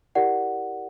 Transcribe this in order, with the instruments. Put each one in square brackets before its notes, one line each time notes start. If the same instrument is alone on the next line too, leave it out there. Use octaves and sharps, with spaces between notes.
[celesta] E4 G4 A#4 D5 F#5